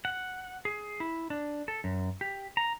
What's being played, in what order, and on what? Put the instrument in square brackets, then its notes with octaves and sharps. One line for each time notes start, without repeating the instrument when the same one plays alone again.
[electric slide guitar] F#5
G#4
E4
D4
A4
F#2
G4
A#5